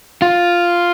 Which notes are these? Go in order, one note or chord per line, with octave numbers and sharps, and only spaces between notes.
F4